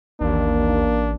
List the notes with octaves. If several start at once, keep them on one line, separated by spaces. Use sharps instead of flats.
A1 D#2 A#3 D4